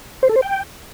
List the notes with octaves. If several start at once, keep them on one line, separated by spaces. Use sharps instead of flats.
C5
A4
C5
G5